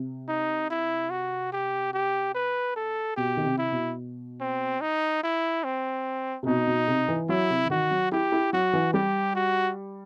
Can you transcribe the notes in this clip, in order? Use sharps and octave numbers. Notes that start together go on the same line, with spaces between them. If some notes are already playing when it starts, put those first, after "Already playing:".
Already playing: C3
D#4
E4
F#4
G4
G4
B4
A4
B2 G4
D#3
C3
E4
B2
C4
D#4
E4
C4
C3
B2 D#4
B2
C3
E3
F#3 E4
C3
E3
D#3 F#4
F#3
E4 G4
E4
F#3 F#4
E3
G3 G4
F#4